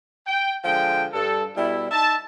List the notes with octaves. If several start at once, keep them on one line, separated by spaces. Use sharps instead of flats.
G5
D3 F3 G#3 G5
G2 A4
B2 G3 E4
D#4 E5 A5